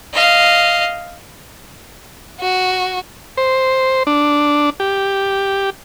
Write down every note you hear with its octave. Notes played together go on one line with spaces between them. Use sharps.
D#5 F5
F#4
C5
D4
G4